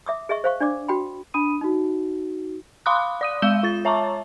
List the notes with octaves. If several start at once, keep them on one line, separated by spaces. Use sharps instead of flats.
E5 D6 D#6
G#4 D#5 E5 C#6
C5 F5 C#6
D4 D5 D6
F#4 G5 B5
D4 B5 D#6 D#7
D#4 F#4
F5 B5 C6 D6 D#6 F#6
D5 D#6 D#7
G#3 F5 E6 G6 E7 G7
F4 A6
C#5 E5 A5 A#5 C#6 D6